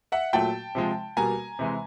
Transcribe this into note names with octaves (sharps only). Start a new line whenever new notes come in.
E5 F#5
A#2 F#3 A3 G5 A5
C3 F3 G#3
B2 G3 A#3 G#5 A#5
C3 E3 G#3